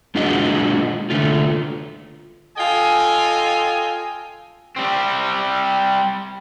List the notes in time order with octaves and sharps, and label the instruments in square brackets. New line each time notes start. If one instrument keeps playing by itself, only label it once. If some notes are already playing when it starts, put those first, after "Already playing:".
[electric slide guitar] G#3 D4 F4 F#4 G#4 D#5
D3 A3 F4
[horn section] F4 A4 D#5 G5 G#5
[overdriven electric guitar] G3 C4